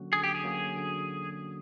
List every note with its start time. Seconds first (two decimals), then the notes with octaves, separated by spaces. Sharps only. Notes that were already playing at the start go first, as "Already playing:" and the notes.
Already playing: D3 F#3 A#3 C#4 F#4
0.12 D3 G#4
0.24 G4
0.35 G#4
0.43 F#3 A#3 C#4 F#4
0.76 D3